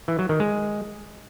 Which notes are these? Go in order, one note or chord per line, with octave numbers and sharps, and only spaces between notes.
E3
F#3
D#3
G#3